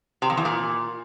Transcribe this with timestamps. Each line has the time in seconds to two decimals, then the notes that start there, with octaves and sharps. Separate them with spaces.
0.22 C3
0.30 F2
0.37 E2
0.45 A#2